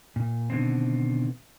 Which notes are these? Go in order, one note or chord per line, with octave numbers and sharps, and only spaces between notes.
A#2
B2 D3 D#3 B3 C4